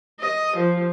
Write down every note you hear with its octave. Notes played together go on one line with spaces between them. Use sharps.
D#5
F3